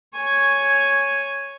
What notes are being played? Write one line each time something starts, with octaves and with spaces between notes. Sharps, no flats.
C#5 G#5